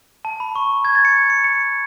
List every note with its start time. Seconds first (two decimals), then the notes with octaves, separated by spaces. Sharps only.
0.25 A5
0.40 B5
0.55 C#6
0.85 G#6
0.95 A6
1.05 C#7
1.30 C#7
1.44 C#7